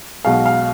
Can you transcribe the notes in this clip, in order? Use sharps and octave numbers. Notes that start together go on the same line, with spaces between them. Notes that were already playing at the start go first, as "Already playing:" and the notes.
B1 B2 G#3 F5
F5